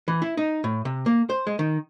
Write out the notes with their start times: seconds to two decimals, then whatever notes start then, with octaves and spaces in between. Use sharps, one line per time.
0.08 E3
0.22 E4
0.37 D#4
0.64 A2
0.85 C3
1.06 A#3
1.30 C5
1.47 G#3
1.59 D#3